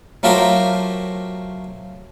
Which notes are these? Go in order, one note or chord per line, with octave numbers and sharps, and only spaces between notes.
F#3 A3 F4 G4 A#4 C5